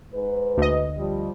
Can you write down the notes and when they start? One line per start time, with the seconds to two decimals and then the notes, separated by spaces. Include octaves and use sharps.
0.13 G#2 B4
0.57 D2 D#5
0.97 F3 G3